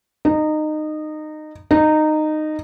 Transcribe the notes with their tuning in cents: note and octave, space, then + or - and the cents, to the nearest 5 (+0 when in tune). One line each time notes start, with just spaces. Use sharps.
D#4 -20
D#4 -15